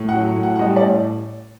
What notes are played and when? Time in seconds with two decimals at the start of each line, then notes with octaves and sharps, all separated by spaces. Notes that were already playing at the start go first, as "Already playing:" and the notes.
Already playing: A2
0.09 F#5
0.14 F#3
0.36 A2
0.43 F#5
0.56 F#5
0.59 G3 D#5
0.76 D5
0.82 A2